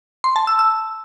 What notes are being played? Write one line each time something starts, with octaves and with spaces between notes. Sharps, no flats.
C6
A5
E6
E6